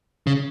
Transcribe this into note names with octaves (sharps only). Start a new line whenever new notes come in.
C#3